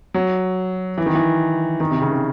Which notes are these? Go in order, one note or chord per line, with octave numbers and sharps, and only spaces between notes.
F#3
E3
D#3
E3
D#3
C3
C#3
D#3